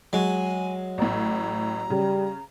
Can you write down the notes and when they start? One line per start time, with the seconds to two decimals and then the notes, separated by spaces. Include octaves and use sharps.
0.13 F#3 G#3 G#5
0.98 A1 A2 A#5
1.90 C#3 G3